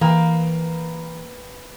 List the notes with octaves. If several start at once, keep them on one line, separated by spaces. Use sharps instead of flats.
E3 A#3 B4 F5 G5